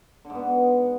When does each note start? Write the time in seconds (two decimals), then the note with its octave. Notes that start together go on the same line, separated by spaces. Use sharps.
0.25 D3
0.30 G#2
0.35 B3